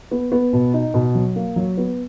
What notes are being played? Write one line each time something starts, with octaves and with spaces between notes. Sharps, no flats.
B3
B3
B2
D#4
B2
F#3
A#3
F#3
B3